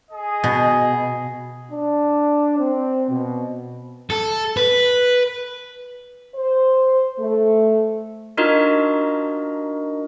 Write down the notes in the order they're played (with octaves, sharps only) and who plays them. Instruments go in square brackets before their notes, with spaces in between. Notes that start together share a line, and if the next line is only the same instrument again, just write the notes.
[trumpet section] G#4 D#5
[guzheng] B2
[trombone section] D4
C4
B2
[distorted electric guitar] A4
B4
[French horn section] C5
A3
[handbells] D4 D#4 F4 F#4 A#4 D#5